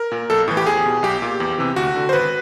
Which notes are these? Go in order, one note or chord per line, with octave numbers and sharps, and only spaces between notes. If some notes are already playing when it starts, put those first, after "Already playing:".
Already playing: A#4
A#2
B1 A4
A2 E3
G4
E2 G#4
B2
B1 G4
A#2
E2
C3 E3
D2 F#4
D3
C5
G#1 B4